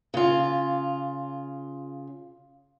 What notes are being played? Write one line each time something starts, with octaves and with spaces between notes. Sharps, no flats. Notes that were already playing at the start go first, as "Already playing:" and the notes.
C#3 F4